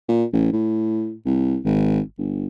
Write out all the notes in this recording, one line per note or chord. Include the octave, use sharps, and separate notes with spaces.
A#2
A1
A2
C2
G#1
G1